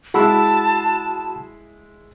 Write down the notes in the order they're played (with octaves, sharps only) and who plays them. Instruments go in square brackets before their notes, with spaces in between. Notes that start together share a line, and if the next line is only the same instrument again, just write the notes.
[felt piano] G#3 E4 [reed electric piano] F#4 B5 E6 [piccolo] A5